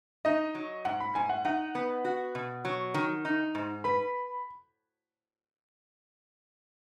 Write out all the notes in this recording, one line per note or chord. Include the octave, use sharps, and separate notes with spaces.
D#4 D#5
F#3
G#2 F#5
B5
G#2 G#5
F#5
D#4 F#5
B3
F#4
B2
F#3
D#3
D#4
G#2
B4 B5